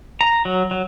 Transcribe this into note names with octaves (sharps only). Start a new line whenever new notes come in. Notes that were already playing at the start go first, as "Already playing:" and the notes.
A#5
F#3
F#3